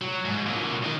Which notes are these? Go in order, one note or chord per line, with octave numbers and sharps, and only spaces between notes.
F#3
G#2
A#2 F#3
D#3